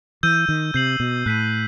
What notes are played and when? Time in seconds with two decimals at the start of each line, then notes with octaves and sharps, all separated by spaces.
0.23 E3 E6 G6 D#7
0.49 D#3
0.74 C3 G6 C7 F#7
1.00 B2
1.26 A2 F#6 B6 D#7